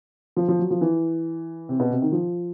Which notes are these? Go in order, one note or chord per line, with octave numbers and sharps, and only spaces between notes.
F3
F3
F#3
F3
E3
C3
B2
C3
D#3
F3